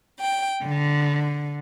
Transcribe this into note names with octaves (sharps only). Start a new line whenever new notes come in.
G5
D3